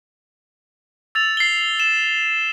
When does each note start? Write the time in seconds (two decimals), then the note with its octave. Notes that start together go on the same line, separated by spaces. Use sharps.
1.15 E6 A6 F7
1.37 C7 G7
1.80 E7